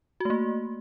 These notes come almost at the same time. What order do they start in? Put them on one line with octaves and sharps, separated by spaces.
F#4 A3 A#3